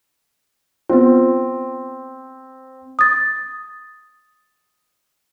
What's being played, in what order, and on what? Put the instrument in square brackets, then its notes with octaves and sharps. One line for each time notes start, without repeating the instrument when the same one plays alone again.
[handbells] B3 F4 [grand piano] C4
[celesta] D#6 A6